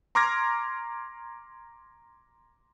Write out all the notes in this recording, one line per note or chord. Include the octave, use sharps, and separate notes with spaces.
A#5 C6 D6 F6 G#6 A#6